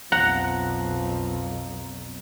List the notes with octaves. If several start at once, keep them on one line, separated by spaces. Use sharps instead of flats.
B1 F2 F3 F#5 A#5